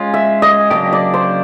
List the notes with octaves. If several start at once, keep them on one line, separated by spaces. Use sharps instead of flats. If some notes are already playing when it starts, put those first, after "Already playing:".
Already playing: G#3 C#4 F4 G#5
E5
D#5
C#3 F#3 A#3 D4 G4 D#5
D5
C5